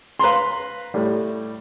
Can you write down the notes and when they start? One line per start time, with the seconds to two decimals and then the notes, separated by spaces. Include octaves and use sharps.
0.19 B4 F5 A#5 C6
0.94 A2 G3